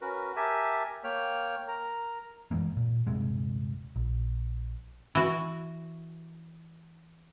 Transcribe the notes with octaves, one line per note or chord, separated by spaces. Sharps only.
C#4 F#4 A#4 B4
G4 A#4 E5 G#5 A5
A#3 C#5 G5 F6
A#4 A#5
F#2 E3 G#3 A#3
A#2
D#1 G2 C3 G#3
A#1
E3 F#4